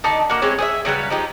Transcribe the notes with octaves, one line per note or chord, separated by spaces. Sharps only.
D3 D#4 A5
A#3 F#4
G#3 C4 E4 C#5
G#4 C5 E5
C#3 F#3 G3 B4
F3 D#4 G4